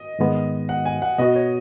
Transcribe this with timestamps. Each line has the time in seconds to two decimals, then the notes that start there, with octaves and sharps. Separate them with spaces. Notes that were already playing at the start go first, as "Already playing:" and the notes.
Already playing: D#5
0.19 G#2 D#3 G#3 B3
0.69 F#5
0.85 G#5
1.02 F#5
1.18 B2 B3 F#4 D#5
1.36 C#5